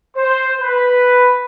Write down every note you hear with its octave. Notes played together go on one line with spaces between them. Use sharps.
C5
B4